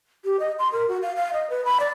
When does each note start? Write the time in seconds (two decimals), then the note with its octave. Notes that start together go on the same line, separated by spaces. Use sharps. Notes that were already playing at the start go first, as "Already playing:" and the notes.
0.25 G4
0.40 D#5
0.59 C6
0.73 A#4
0.89 F#4
1.02 F5
1.16 F5
1.33 D#5
1.50 B4
1.65 B5
1.80 D5